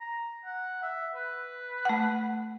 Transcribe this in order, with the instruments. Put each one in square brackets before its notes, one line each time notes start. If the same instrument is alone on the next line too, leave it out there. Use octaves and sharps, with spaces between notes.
[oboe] A#5
F#5
E5
B4
[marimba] A3 F#5